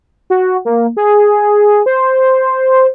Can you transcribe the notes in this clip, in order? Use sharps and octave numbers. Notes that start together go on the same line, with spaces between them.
F#4
A#3
G#4
C5